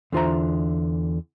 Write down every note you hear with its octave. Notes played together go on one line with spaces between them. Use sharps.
E2 D3 F4 C5 E5 A#5